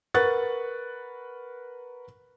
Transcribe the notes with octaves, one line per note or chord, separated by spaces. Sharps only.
A#4 B4 F#5 C#6 F#6 A6